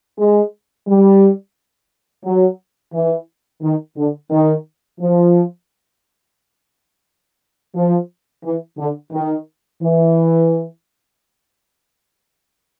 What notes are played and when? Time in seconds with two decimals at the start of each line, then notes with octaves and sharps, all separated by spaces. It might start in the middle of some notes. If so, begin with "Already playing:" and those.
0.18 G#3
0.87 G3
2.25 F#3
2.93 E3
3.62 D#3
3.96 D3
4.30 D#3
5.00 F3
7.75 F3
8.43 E3
8.77 D3
9.13 D#3
9.81 E3